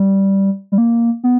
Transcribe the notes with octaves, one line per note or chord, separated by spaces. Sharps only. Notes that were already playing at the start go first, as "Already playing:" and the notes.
Already playing: G3
G3
A#3
B3